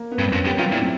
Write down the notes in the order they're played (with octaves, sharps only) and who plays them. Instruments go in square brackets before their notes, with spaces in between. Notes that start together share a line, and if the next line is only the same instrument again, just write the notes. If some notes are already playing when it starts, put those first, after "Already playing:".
Already playing: [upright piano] A#3
B3
[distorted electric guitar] G2 [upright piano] C4
[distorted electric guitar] F2 [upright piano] C#4
[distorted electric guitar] F#2 [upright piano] G4
[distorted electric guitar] F#2 [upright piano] F4
[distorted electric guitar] A#2 [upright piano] E4
[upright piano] C4